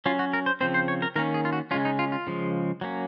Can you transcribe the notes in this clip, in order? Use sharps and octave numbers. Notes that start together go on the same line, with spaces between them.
F#3 C#4 F4
F#4
A#4
C5
C#3 F3 C4 C5
C5
C#5
A#4
D#3 A#3 C#4 A#4
G#4
F4
F#4
C#3 G#3 C#4 F4
D#4
F4
F4
C#3 F3 G#3
F#3 A#3 C#4